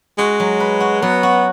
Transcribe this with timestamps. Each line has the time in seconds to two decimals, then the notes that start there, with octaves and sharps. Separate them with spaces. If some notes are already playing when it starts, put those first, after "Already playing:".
0.18 G#3 F#4
0.40 F#3
0.60 B4
0.80 F#4
1.02 F#3 B3
1.23 F#4